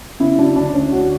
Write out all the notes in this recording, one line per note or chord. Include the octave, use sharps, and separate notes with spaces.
C#3 E4
F#3 D4
D2 D4
D2 C#4
D2 F#4